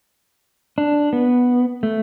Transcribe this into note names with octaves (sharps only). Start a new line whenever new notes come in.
D4
B3
A3